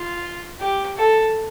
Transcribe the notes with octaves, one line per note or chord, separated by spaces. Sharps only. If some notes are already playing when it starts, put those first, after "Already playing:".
Already playing: F4
G4
A4